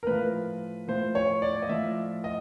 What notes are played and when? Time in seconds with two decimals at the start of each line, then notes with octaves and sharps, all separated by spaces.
0.03 A#4
0.07 A2 F3 B4
0.88 A2 F3 C5
1.15 C#5
1.42 D5
1.62 D#5
1.69 A2 F3 E5
2.24 D#5